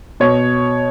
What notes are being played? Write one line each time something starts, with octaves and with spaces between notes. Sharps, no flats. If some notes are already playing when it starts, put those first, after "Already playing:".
B2 C#5